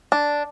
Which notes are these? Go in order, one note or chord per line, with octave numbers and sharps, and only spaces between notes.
D4